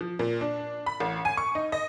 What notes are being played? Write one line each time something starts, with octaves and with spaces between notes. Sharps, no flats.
F3
A#2
D4
B5
A1
G#5
C#6
D#4
D#5